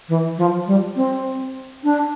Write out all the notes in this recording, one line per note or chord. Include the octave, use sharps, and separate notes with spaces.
E3
F3
G3
C4
D4